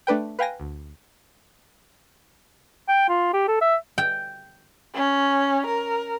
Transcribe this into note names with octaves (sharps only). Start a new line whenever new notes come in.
A3 D4 B4 G5
B4 F5 G5 G#5 A#6
D2
G5
F4
G4
A4
E5
G5
C#4
A#4